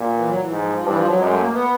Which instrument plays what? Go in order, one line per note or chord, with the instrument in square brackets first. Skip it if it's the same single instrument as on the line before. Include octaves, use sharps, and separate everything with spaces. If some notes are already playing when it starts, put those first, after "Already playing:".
Already playing: [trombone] A#2
[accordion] E3
F#3
E3
[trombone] G#2
[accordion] F3
F3
[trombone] G2 [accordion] E3
[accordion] F3
F#3
[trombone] F#2 [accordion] G#3
[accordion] A3
A#3
B3